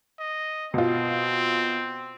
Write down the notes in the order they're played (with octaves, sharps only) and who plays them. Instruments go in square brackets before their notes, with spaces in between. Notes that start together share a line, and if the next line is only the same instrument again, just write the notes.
[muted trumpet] D#5
[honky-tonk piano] B2 F4 [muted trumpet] C4